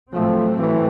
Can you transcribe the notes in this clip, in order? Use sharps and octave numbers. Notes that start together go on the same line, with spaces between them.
A2 F3 F#3 A3 C4
E3